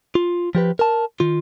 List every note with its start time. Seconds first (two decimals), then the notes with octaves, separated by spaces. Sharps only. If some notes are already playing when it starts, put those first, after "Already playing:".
0.15 F4
0.55 F3 G4 B4
0.79 A#4 A5
1.20 D#3 F4